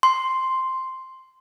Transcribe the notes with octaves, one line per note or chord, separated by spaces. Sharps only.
C6